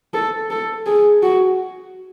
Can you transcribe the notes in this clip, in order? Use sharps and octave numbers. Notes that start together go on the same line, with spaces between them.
A4
A4
G#4
F#4